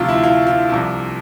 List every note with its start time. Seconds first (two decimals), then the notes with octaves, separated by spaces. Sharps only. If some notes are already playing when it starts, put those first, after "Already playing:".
Already playing: D2 C3 F3 F4
0.09 E4
0.24 F4
0.47 F4
0.69 C2 C3 F3